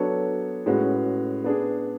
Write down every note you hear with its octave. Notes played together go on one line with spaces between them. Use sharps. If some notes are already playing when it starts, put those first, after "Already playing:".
Already playing: F#3 B3 D4 A4 C#5
A2 G#3 C#4 F#4 B4
B3 D4 G#4